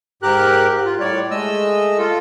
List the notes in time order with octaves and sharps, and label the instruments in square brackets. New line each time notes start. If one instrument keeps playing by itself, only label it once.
[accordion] G#2 G4 A#4 F#6
F4
A2 G3 C#5 D5
G#3 A3 D#5 E6
F4 A4